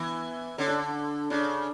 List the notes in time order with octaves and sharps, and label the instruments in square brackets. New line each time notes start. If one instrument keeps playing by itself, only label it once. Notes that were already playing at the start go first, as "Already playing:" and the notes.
Already playing: [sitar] E3 [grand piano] B3
[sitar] D3 [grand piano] C#4
[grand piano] D4
[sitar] C#3 [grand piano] D4